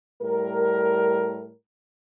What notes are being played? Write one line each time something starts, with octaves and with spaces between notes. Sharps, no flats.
A2 G3 A#4